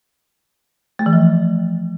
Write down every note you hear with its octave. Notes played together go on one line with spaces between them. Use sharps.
A3
E3
F3